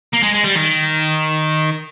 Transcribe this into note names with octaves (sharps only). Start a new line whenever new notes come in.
A#3
G#3
G#3
G3
D#3